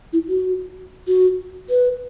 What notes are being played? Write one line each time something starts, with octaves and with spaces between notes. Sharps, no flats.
E4
F#4
F#4
B4